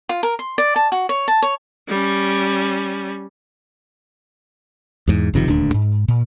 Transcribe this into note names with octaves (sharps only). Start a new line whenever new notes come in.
F4
A#4
C6
D5
A5
F#4
C#5
A5
C#5
G3 C#4
E2 G#2
F#1 C3 D#3 F3
D#1 D2 D4
G#2
A#2